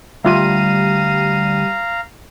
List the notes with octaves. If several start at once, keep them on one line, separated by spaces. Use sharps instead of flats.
D2 G3 F4 E5 F5 A#5 D#7